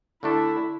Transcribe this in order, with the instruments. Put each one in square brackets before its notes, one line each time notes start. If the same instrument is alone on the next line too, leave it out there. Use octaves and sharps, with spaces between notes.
[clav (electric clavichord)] D3 A3 D4 A4 [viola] E4